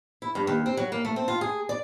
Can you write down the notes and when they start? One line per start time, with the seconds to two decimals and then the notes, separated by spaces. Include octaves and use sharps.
0.22 E4
0.35 G2
0.47 D#2
0.66 C4
0.77 F#3
0.92 A#3
1.05 A3
1.16 C4
1.28 F4
1.41 G#4
1.69 D5